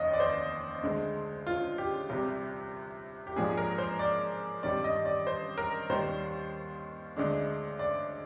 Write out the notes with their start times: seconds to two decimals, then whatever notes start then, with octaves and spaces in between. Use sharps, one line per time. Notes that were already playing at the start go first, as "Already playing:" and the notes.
Already playing: F1 D#2 D#3 D#5
0.13 D5
0.20 C5
0.83 D2 D3 G#3
1.47 F4
1.78 G4
2.09 C2 C3 G3
3.27 G4
3.36 G#2 F3 A#3 D4 G#4
3.58 A#4
3.78 C5
3.99 D5
4.63 G2 D#3 G3 C4 D5
4.84 D#5
5.05 D5
5.27 C5
5.58 A#4
5.89 D#2 D#3 G3 C5
7.16 D2 D3 G#3 D4
7.79 D5